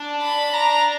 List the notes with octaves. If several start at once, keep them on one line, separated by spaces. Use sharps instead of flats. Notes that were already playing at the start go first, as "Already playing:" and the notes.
Already playing: D4
B5
A#5